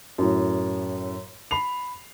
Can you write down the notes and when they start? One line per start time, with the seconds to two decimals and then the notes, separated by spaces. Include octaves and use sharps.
0.18 F#2 A2
1.51 B5 C7 F7